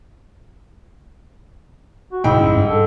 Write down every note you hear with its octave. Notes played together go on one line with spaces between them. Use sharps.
F#4
D2 G#2 B2 G#3 D#4 E4 G5
A#1 F#2 C#4
G2 G3
A4